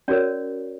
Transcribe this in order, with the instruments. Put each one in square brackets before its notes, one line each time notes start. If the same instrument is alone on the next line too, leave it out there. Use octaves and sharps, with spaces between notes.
[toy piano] C#4 F#4 A#4 C#5 D5